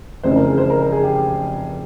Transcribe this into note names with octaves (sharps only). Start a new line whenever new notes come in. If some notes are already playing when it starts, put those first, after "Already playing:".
F1 F2 C#3 E3 C5
A#4
G#4
C5
A#4
A#4
G#4
G4
G4